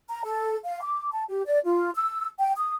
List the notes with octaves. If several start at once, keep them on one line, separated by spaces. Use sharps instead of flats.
A#5
A4
F5
D6
A5
G4
D5
F4
E6
G5
D#6